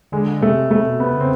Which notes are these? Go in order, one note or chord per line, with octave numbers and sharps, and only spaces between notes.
D3 G#3
C3 A3
C3 A3
B2
C3 B3
C#3
C4